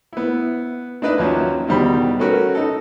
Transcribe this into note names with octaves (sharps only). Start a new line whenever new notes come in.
B3 E4
D4 D#4 B4 D5 E5
D#2 F3 F#3 C#4
E2 B2 D#3 G3 C5 B5
A3 C#4 F#4 A#4 B4
D#4 A4